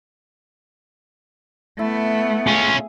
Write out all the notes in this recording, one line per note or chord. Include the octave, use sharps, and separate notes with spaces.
A3 B3 E4
C#4 F4 G#4 D#6